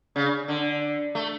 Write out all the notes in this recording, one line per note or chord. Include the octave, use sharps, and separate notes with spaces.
C#3
D3
A3